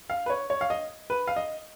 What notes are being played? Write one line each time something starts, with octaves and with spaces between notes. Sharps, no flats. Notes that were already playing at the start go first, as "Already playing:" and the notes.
F5
B4
C#5
C#5
F5
D#5
B4
F5
D#5